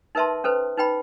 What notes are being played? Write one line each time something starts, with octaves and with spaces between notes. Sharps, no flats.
D#4 A#4 B4 E5 A5 C6
C#4 A4 B4 C5
D#4 B4 G5 B5